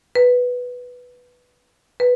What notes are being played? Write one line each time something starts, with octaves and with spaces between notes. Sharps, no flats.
B4
B4